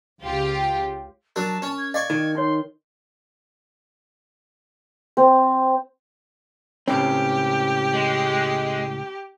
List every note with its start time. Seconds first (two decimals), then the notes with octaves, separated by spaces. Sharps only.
0.22 C#2 F4 G4
1.36 F#3 D4 A#4 A5
1.62 C#4
1.78 G#6
1.94 D5 D#5 F5 C#6 G#6
2.10 D#3
2.35 D#4 C#5 C6
5.17 C4
6.88 C#2 A2 C4 C#4 G4
7.94 G#3